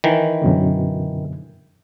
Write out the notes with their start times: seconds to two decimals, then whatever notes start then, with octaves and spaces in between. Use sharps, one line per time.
0.04 D#3 E3
0.42 F#2 B2 D3